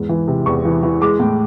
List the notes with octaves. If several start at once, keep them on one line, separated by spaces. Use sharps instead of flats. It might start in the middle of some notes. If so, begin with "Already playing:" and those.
Already playing: E2 G#2
E3
C3
E2 C#6
E3
E3
G#3 D6
A2